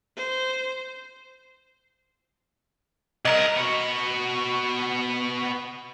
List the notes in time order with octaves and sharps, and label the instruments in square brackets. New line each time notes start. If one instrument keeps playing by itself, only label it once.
[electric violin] C5
[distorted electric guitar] C2 A#4 [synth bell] D#5 A#5
[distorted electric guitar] B3 F#4